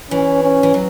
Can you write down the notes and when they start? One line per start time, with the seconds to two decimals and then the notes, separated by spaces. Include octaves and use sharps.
0.11 E3 C#4
0.43 C#4
0.63 E3
0.74 F#3